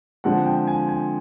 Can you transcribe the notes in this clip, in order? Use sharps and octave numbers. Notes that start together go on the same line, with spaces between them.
D3 F3 G#3 C4 F#5
G5
G#5
G#5